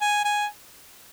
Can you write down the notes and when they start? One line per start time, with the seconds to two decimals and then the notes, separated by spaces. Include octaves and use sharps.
0.01 G#5
0.25 G#5